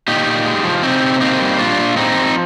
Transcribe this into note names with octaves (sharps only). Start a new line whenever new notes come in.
A#2 D#4 G4
A#2
G#3
F3
C3 C4 D#4
C3
A#3 C4 D#4
G3
A#2 D4 F4
A#2
G#3 C4 D#4
F3